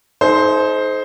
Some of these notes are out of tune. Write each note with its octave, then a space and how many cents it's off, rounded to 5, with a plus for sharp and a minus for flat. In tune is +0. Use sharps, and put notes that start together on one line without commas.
D#4 +20 A4 -45 C5 +0